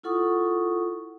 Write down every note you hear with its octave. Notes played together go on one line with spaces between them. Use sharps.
E4 F4 A4 F#5 C#6 D#6